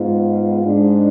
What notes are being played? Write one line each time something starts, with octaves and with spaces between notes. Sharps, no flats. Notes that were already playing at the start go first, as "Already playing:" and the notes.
Already playing: G#2 G#3 B3 F4
G#2 G#3 D4 G#4